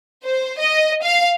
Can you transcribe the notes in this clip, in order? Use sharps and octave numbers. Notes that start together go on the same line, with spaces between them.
C5
D#5
F5